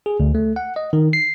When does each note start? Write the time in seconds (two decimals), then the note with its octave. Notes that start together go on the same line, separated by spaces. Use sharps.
0.06 G#4
0.20 D2
0.35 A3
0.56 F#5
0.76 D#5
0.93 D#3
1.13 C7